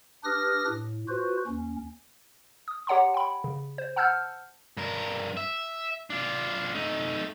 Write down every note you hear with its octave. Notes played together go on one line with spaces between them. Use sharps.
D4 G4 B4 D#6 F6 A#6
A2
F4 F#4 B4 C5
D#2 C#4
D#6
G4 C#5 F#5 A#5 C6
G5 B5
C#3
C5
F#5 A5 E6 F6 G6
G2 A#4
E5
D4 F4
A3 D#4